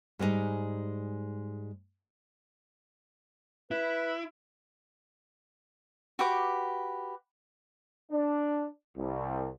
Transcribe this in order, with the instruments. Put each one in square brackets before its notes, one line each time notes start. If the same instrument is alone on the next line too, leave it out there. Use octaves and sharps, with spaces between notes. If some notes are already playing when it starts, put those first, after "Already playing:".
[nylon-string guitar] G#2 G3 G#3 B3 D#4
[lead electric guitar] E4 [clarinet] B4
[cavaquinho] F#4 G4 B4 D6
[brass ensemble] D4
C2